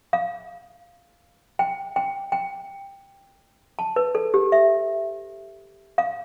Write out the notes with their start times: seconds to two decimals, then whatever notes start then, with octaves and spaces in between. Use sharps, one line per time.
0.13 F5
1.59 G5
1.96 G5
2.32 G5
3.79 A5
3.96 B4
4.15 A4
4.34 G4
4.52 E5
5.98 F5